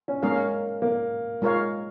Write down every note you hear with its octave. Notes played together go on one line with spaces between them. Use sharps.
C#4
G#3 A#3 C#4 A#4 F5
A#3
G#3 F4 A#4 C#5 F5